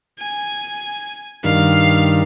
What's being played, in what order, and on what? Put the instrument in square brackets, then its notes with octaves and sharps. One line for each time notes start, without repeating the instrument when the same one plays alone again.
[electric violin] G#5
[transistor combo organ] G2 D#3 [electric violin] F5